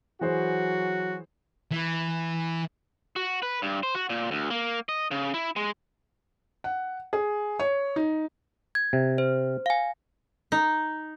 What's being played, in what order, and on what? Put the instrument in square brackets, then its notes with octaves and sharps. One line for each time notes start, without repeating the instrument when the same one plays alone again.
[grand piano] E3 G#4 C5 [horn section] F#3 F#4
[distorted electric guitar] E3
[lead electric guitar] F#4
B4
G2
C5
F#4
A#2
D2
A#3
D#5
C#3
E4
G#3
[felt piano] F#5
G#4
C#5
D#4
[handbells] G#6
[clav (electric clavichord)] C3
[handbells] C5
F5 G#5
[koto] D#4